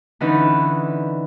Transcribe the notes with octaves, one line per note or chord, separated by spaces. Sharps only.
D3 E3 C#4 D#4 B4